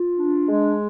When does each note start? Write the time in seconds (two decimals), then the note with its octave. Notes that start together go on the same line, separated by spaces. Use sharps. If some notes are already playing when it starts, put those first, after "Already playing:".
Already playing: F4
0.19 D4
0.49 G#3